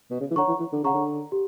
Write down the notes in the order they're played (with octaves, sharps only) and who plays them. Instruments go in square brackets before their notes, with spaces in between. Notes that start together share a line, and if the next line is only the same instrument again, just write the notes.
[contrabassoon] B2
C#3
E3
[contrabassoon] D3 [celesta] C#5 F#5 A#5 C#6
[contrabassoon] E3
E3
D3
[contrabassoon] C#3 [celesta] C#5 F#5 A#5 C#6
[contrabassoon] D3
[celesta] G4